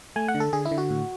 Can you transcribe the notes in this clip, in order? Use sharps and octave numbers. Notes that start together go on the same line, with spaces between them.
A3 G#5
F#5
D3
A4
D3 G#4
E4
D3
F#4
A2